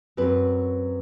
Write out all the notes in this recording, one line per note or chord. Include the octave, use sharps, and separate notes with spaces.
F#2 F#3 C4 B4